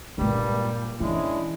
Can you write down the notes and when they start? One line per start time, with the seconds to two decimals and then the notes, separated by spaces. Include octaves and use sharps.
0.18 G2 A#2 G3 G#3 A#3
1.01 E3 G#3 C#4 D4 E4